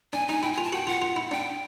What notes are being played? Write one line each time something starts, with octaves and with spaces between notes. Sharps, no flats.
D4 G#5
D#4 G#5
E4 G5
G#5
F4
A5
F#4 G5
F4 F#5
F4
E4
D4 G5